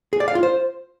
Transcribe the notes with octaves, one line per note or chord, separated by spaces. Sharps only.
G#4
D5
F5
F4
C5